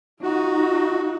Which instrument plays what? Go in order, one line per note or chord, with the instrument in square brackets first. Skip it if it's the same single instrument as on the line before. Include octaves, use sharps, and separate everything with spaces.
[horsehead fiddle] D#4 F4 [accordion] F#4